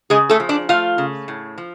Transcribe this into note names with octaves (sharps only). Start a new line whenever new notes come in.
C#3 G#3 G#4
A3 A4
F3
D4 D5
A3 F4 F5
C#3
A2
F3